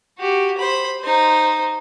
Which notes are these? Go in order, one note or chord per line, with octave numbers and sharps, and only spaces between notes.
F#4 G4
C5 B5
D#4 C5